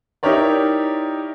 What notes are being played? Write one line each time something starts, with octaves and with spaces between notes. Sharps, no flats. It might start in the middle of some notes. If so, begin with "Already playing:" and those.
D#4 E4 G4 A#4 C#5 D5